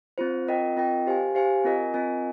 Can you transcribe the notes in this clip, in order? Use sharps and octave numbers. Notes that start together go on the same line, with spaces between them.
C4 F4 C5
C4 F4 A#4 D#5 G5
C4 F4 A#4 D#5 G5
G4 C5 F5 G#5
G4 C5 F5 G#5
C4 F4 A#4 D#5 G#5
C4 F4 A#4 D#5 G#5